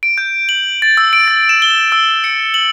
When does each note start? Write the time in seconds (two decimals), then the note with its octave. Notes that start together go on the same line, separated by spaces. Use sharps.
0.03 D7
0.18 G6
0.49 F#7
0.82 A6
0.97 E6
1.13 D7
1.28 A6
1.49 E7
1.62 G7
1.92 E6
2.24 C#7
2.54 F#7